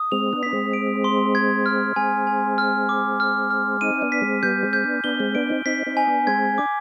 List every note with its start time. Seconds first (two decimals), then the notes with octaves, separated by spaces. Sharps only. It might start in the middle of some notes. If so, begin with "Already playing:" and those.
Already playing: D#6
0.12 G#3 C4 F7
0.33 B3 D4
0.43 D4 B6
0.53 G#3 C4
0.73 D7
1.04 C6
1.35 G#6
1.66 F6
1.96 G#3 C4 G#5
2.27 G#5
2.58 F6
2.89 D6
3.20 F6
3.50 F6
3.81 C4 D#4 D#7
4.02 B3 D4
4.12 B6
4.22 G#3 C4
4.43 G3 B3 G6
4.63 G#3 C4
4.73 G6
4.84 B3 D4
5.04 B3 D4 G7
5.20 G#3 C4
5.35 B3 D4 D7
5.50 C4 D#4
5.66 C4 D#4 B6
5.86 C4 D#4
5.97 G#5
6.07 B3 D4
6.27 G#3 C4 G#6
6.58 D4 D6